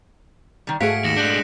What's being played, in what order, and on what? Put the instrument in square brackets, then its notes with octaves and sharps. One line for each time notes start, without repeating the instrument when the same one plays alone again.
[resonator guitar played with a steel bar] D#3 G3
[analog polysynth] G#2 A3 G#4 [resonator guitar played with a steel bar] F#4 F5 [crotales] B6 C#7 D7
[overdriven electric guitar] D#2 [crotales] A#6 C#7 E7
[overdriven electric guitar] G#3 D4 [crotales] F#6 G6 E7